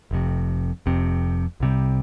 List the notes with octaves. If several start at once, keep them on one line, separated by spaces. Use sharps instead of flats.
F1 F2 C3
F1 F2 C3
C2 C3 G3